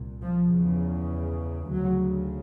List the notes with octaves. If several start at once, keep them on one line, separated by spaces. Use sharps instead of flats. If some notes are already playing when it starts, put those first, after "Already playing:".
Already playing: C2 A#2
F3
E2 C#3
D2 C#3 F#3